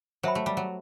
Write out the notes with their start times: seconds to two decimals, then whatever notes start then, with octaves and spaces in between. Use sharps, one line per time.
0.23 F#3 C5 E5 G5 B5
0.35 A3
0.46 G3
0.57 F#3